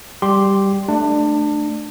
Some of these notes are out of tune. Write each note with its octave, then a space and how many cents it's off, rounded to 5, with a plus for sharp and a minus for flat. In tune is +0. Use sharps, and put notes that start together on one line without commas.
G3 +0 G4 +0 C6 +0
A3 +0 D4 +25